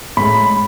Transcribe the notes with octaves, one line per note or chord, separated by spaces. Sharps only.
A2 G#3 B5